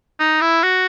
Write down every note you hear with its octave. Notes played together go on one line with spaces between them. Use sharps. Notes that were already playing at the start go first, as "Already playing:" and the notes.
D#4
E4
F#4